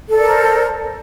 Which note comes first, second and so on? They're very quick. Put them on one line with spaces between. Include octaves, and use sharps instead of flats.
A4 D5 A#4 C5